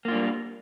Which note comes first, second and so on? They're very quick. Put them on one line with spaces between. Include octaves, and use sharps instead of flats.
A#3 F4 D4 G3